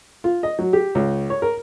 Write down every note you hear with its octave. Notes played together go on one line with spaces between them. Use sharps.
F4
D#5
F#3
G4
C#2
C#5
A#4